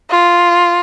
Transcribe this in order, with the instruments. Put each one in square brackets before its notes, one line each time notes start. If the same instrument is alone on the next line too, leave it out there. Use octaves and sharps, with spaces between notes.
[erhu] F4